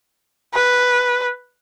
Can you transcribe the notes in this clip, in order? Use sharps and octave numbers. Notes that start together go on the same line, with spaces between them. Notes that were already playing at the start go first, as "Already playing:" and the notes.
B4